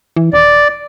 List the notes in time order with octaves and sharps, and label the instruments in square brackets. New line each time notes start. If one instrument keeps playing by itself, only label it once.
[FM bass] E3
[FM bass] D#1 [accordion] D5